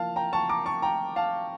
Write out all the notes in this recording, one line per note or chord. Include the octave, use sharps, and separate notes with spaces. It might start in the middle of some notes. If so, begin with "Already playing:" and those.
Already playing: F3 A#3 E4 F5 A5
G5 A#5
A5 C#6
A#5 D6
A5 C#6
G5 A#5
F5 A5